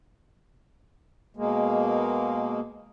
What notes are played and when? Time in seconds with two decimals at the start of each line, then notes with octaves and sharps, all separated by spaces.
1.37 B2 G#3 A#3